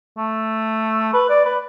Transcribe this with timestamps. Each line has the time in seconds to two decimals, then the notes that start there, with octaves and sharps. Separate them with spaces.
0.18 A3
1.14 B4
1.30 D5
1.45 B4